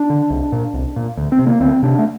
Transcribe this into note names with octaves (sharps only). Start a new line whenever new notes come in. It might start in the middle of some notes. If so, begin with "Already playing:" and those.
Already playing: D4
D3
C2
A#2
C2
A#2
D2
C4
C3
A#3
D2 C4
C3 D4
A3